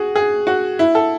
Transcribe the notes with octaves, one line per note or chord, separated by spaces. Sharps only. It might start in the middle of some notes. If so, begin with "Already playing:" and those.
Already playing: F#4 G#4
G#4
F#4
E4
A4